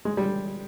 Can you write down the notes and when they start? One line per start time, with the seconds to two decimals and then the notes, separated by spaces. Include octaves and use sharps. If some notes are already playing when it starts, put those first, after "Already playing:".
0.05 G#3
0.17 G3